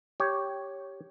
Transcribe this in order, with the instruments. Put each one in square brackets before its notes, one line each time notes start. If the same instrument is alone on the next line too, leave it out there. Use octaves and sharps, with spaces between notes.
[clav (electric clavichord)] G4 C#5